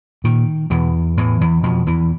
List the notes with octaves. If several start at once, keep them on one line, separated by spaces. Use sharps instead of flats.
A#2 D#3
E2 B2 E3
E2 A2 E3
E2 E3
F2 B2 F3
E2 E3